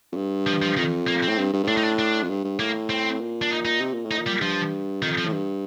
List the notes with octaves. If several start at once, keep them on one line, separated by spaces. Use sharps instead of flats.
F2
G2
F3
F3
F2 D#3
A#3
C4
A2
G2
G2
G2
A2 D4
D#4
D4
D4
F2
G2
G2
A2 A#3
C4
A#2
D4
D#4
D#4
C3
A#2
A2
D#4
A#2
G3
G2 F3
F2 D#3
F3
A2
G2